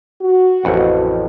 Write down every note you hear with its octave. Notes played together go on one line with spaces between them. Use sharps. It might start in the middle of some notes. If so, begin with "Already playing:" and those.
F#4
A1 F2 F#5